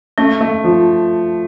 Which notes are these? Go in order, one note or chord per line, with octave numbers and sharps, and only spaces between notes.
A3 C#4
A3
F3